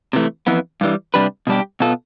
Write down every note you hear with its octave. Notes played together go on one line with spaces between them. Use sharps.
C3 E3 A3
F2 E3 B3
G2 E3 G3
C3 G3 D4 G4 B4
B2 G3 D4 G4
B2 B3 F4 A4